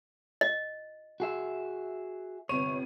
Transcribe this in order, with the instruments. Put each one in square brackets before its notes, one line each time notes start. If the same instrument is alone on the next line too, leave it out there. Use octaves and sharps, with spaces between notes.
[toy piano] D#5
[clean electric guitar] F#4 G#4 E5
[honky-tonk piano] G1 C3 D#7 [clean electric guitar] C#5